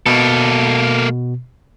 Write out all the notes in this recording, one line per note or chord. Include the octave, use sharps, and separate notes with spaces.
B2 A#3 A4